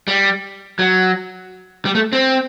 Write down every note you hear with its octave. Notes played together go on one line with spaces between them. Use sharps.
G3
F#3
G3
A3
C4